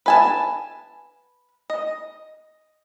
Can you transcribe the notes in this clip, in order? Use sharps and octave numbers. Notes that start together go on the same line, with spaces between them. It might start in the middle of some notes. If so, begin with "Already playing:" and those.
B4 G#5 A5
D#5